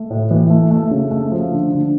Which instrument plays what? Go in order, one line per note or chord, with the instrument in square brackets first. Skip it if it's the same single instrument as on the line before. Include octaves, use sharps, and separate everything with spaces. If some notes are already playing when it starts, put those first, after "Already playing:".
Already playing: [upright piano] A3
A2
E3
A3
A3
C#3
A3
F3
D3
D3